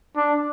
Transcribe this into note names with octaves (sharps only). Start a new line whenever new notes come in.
D4